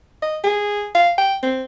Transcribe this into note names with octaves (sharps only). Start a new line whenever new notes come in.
D#5
G#4
F5
G5
C4